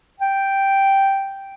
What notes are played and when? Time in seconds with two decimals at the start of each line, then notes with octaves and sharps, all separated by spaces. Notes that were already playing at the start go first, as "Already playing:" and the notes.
0.20 G5